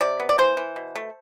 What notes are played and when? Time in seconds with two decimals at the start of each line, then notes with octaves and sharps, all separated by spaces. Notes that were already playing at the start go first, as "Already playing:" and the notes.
0.01 C3 D5
0.20 B3
0.29 D5
0.38 E3 C5
0.57 E3
0.76 B2
0.95 A3